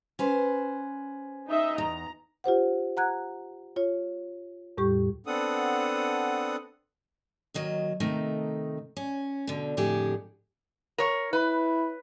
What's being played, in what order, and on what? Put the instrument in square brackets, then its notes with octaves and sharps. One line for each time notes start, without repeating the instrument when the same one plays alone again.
[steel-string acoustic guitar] C#4 B4 C5
[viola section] D#4 D#5 E5
[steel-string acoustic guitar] E2 [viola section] A#5
[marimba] F4 G4 C5 F#5
F#5 A#5 F#6 G#6
F4 C#5
E2 A2 G3 G4 C#6
[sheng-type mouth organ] B3 C4 D4 A4 F#5 D#6
[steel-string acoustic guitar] D#2 D#3 F#3 D#5
C3 D#3 A3 D#4
C#4
B2 D3
F2 A2 D3 G4 G#4 E5
[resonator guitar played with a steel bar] A#4 C#5
[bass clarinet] E4 [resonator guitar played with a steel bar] B4